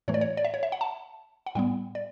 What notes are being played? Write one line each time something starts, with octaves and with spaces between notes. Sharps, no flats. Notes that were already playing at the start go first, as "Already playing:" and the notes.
A2 E3 A3 C#5
D5
C#5
D5
E5
C#5
E5
F#5
A5
F#5
A2 G3 B3 G5
D5